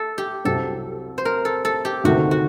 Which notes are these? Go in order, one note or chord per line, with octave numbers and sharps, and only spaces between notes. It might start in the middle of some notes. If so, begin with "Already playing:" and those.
Already playing: A4
G4
C2 C3 F#3 C4 A4
C5
A#4
A4
A4
G4
D2 C3 D#3 A3 F#4
F#4